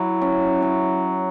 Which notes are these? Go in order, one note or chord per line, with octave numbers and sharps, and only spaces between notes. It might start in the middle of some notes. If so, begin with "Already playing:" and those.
Already playing: F#3 E4
C#4
C#4